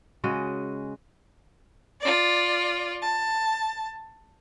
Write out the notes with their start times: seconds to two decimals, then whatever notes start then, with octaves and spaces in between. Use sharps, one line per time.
0.24 C#3 G#3 F#4 D#5
2.00 F4 D5
3.02 A5